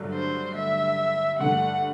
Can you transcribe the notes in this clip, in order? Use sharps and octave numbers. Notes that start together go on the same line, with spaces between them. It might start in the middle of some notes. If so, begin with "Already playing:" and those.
Already playing: G2 D3 F#3 A3
C5
E5
G2 D3 A3 F#5